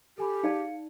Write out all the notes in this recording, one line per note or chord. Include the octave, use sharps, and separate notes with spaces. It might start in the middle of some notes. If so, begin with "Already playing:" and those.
G4 A4 G#5 B5
D#4 G#4 D5 F5 A5 C#7